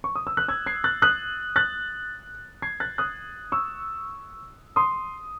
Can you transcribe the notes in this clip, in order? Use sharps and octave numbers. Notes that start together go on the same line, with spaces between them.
C#6
D#6
E6
F#6
E6 G#6
G#6 C7
F#6 A6
D#6 F#6
F#6 A6
G#6 C7
F#6 A6
D#6 F#6
C#6 E6
C6 D#6